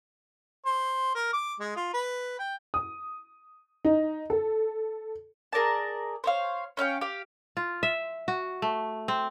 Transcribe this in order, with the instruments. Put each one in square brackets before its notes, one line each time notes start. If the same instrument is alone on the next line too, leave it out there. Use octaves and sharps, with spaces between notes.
[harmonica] C5
A#4
D6
G#3
F4
B4
G5
[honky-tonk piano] D#6
D#4
A4
[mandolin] G#4 A#4 D5 A5
C5 C#5 F5
C#4 E5 F5 G5
G4 F5
[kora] F4
E5
F#4
A3
C4